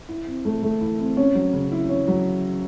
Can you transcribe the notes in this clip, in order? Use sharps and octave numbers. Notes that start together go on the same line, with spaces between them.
E4
C4
A3
A3
E4
C4
C#4
F#3
C#3
E4
C#4
F#3